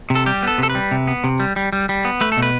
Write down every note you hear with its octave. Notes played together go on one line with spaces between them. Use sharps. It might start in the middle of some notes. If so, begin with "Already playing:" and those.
C3
A4
G3 G4
B3 A4
C3 A4
B4
G3
C3
B3
C3
G3
G3
G3
G3
B3
A3 B4
A4
B2
B4